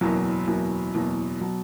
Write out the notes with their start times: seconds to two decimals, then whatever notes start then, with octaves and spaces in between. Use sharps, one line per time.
0.01 F#1 E2 B2 F#3
0.47 F#1 E2 B2 F#3
0.94 F#1 E2 B2 F#3
1.41 B2 F#3